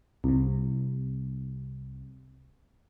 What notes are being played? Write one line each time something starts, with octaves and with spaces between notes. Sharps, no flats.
C2 C3